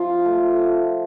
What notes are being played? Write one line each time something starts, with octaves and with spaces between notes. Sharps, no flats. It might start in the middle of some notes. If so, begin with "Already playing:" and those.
Already playing: F3 F4
A3